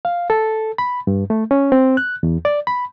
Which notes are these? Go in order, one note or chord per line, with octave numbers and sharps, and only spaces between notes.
F5
A4
B5
G2
A3
C#4
C4
F#6
E2
D5
B5